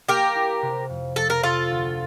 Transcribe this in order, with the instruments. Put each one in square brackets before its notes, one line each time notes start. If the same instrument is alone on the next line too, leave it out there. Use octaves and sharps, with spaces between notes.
[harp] A#3 [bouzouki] G4 A#4
[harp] E4
C3
F2
[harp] F2 [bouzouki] A4
[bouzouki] A#4
[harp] C3 [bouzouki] F4 A4
[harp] D2